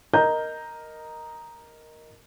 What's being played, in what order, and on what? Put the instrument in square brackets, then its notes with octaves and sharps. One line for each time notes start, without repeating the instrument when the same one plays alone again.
[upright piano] A#4 D#5 A#5 G6